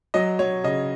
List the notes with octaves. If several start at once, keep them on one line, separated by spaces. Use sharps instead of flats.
F#3 D#5
F#3 C#5
C#3 D#5